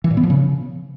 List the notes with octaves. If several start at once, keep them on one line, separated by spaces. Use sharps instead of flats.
E3
A#2
B3
F3
C#3